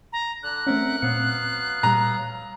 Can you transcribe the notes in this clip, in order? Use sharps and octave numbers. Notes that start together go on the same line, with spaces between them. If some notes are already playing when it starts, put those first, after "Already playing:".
A#5
D3 D4 F#6
A3 C4 C#4 A#4 E5 F#5
A#2 F#3 B3 C4 F5 C#7
A#2 G3 A#5